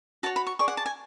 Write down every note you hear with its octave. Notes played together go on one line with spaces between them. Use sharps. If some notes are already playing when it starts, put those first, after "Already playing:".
F#4 C#5 A5
B5
C#6
G#4 D5 C#6
F#5
A5
G#5